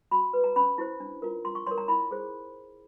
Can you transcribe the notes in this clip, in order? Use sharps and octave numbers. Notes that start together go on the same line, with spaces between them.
F#4 B5
B4
A#5
C#4 B5
E4 G4 C5
D4
F4 A#4
F4 C6
C#6
A#4 C#5 C6
A#5
E4 B5
G#4 C5